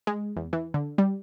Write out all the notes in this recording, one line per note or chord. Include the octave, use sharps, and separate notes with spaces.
G#3
E2
E3
D3
G3